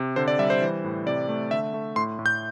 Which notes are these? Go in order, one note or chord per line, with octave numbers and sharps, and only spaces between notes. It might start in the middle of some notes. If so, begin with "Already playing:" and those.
Already playing: C3
D3 C5
D5
G3 E5
C5
E3
A2
C3 D5
A3
D3 E5
A3
A2 C6
A2
G6